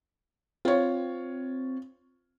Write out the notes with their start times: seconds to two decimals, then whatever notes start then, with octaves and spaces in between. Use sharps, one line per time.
0.65 C4 F4 C#5